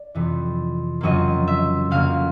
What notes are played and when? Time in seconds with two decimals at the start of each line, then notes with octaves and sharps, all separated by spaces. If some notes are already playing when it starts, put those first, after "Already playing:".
Already playing: D5
0.15 F2 C3 E3
1.01 F2 C#3 F#3 A#3 C#4 D#5
1.48 E5
1.91 F2 C#3 F#3 A#3 C#4 F5